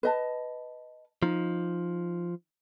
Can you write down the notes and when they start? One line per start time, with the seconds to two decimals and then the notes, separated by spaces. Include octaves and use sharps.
0.03 B4 D#5 A5
1.23 F3 D#4